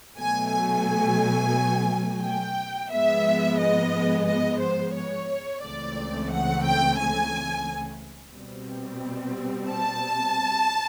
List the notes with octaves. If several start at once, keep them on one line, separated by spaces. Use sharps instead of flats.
B2 F#3 A3 G#5
G#5
G5
G#2 F3 G#3 B3 E5
D#5
D#5
C5
C#5
C#2 C#3 E3 A3 C4 D5
F#5
G5
G#5
B2 G3 C4
A5